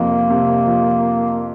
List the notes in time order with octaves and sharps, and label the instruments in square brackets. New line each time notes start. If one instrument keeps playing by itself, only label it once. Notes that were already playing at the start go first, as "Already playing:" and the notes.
Already playing: [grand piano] F2 C3 [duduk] A#3
[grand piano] C3
F3